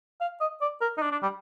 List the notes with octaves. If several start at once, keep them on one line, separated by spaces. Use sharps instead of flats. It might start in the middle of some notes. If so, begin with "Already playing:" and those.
F5
D#5
D5
A#4
D#4
D4
D4
G3